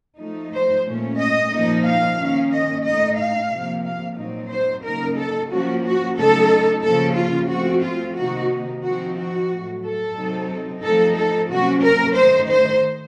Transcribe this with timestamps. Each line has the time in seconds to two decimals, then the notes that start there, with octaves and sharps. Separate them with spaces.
0.18 F3 A3 D#4
0.52 C5
0.85 A#2 A3 C#4
1.18 D#5
1.51 A#2 F3 A#3 D#4
1.84 F5
2.18 D#3 A#3 C#4
2.52 D#5
2.84 A2 A3 D#4 D#5
3.18 F5
3.51 C3 F3 A#3
3.84 F5
4.17 A#2 F#3 C4 D#4
4.50 C5
4.83 C#3 F#3 A#3 D#4 A#4
5.18 A4
5.50 F3 A#3 C#4 F#4
5.84 F#4
6.17 C#3 F#3 A3 D#4 A4
6.83 C#3 F3 A#3 A4
7.16 F4
7.50 F3 A3 C4 F#4
7.84 F4
8.16 C3 D#3 A#3 D#4 F#4
8.83 F3 C4 D#4 F#4
9.16 F#4
9.50 A2 F#3 A3
9.83 A4
10.16 C3 F#3 C4 D#4
10.83 F3 A3 C4 D#4 A4
11.16 A4
11.50 C3 F#3 A#3 C#4 F#4
11.83 A#4
12.16 D#3 A3 D#4 C5
12.49 C5